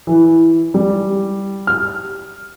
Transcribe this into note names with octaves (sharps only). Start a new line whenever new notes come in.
E3
G3
F6